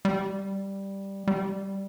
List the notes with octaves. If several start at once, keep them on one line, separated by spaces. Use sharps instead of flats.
G3
G3